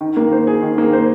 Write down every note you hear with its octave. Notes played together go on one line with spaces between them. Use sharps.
D#3
A#3
C5
G#4
D#3
A#3
C5